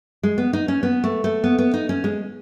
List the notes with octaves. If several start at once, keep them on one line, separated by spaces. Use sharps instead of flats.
G#3
B3
D#4
C#4
B3
A3
A3
B3
B3
D#4
C#4
G#3